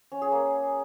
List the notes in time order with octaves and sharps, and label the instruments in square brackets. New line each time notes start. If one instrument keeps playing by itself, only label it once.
[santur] C#4
G#4
A#3